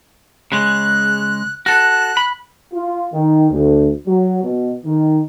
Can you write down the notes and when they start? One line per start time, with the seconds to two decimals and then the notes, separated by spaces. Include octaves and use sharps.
0.52 C#3 G#3 F#6
1.66 F#4 A4 F#6
2.17 B5
2.73 F4
3.13 D#3
3.51 D2
4.07 F#3
4.44 B2
4.85 D#3